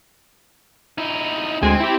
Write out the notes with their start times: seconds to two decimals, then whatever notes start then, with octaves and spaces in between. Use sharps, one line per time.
0.98 D#4 E4
1.62 D2 G#3 C4 G#5
1.80 E4 G4